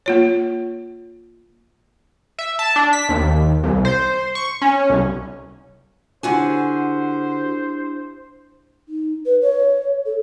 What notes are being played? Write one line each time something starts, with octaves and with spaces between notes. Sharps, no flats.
A#3 F4 C#5
E5
A5
D4
B6
D#2
C2
C5
C#6
C#4
C2
D3 D4 E4 F#4 G4 C5 G#5
D#4
B4
C#5
A4